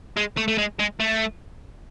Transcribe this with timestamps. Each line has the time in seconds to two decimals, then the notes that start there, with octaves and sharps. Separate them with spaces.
0.17 G#3
0.37 A3
0.48 A3
0.58 G#3
0.79 G#3
1.00 A3